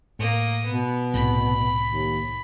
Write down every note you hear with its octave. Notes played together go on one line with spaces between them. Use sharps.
A2 A#3 D#6
B2 B3
C2 A2 B5
D#2